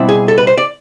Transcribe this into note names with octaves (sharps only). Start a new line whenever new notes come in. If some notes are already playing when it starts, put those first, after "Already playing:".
Already playing: B2 G3 C4 E4
G#4
A4
B4
C5
D5